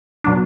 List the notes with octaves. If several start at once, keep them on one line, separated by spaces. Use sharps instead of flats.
B2 F#3 D4